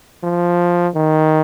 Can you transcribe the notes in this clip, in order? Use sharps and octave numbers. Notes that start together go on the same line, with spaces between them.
F3
D#3